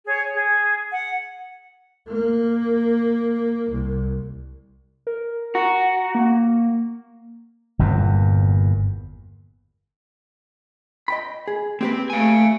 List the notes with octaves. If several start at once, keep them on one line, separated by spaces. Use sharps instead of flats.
G#4 C#5
G#4
F#5
A#3
C2
A#4
F#4 A#5
A#3
G1 E2 A#2
D#5 G5 B5
G#4
A#3 C4 G4 B4
A3 F5 G#5